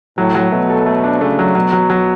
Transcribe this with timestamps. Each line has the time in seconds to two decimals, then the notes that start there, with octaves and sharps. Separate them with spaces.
0.18 A2 F#3
0.35 F#3
0.52 B2 A3
0.70 A4
0.86 A3
1.04 D4
1.21 C#3 A3
1.39 F#3
1.55 B2 F#3
1.73 F#3
1.90 F#3